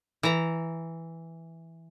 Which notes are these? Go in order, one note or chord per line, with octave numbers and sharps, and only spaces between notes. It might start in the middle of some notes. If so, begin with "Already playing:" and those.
E3 A#5